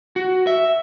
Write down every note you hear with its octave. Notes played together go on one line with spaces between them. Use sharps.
F#4
E5